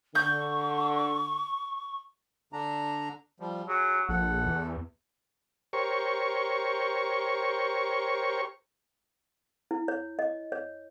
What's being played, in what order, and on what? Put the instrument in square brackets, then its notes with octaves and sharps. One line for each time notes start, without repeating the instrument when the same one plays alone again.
[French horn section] D3 [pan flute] C#6 [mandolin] G6
[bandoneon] D3 D4 A#5
F3 G3
[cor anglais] F#3 [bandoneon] G#4
[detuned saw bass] A#1 [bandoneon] A4 [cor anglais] F#5
[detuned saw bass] E2
[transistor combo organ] G4 A#4 C5 C#5 C#6
[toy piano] E4
C#5
D#5
C#5